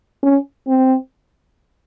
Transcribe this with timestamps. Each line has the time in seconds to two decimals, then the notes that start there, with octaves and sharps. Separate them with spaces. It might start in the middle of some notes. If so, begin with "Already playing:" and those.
0.23 C#4
0.67 C4